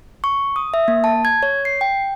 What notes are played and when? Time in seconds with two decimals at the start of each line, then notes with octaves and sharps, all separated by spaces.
0.24 C#6
0.56 D#6
0.74 E5
0.88 A#3
1.04 A5
1.25 G#6
1.43 C#5
1.65 C7
1.81 G5